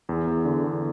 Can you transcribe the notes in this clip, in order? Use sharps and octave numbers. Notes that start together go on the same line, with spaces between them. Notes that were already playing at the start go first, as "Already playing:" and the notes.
E2
E2
D3
E2